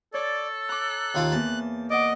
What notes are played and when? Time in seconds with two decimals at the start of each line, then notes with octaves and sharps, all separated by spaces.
0.14 A4 C#5 D5 E6
0.69 A#5 D6 F#6
1.15 D#2 F4 A5
1.32 E2 A#3 A5
1.90 D5 D#5 F#5 D6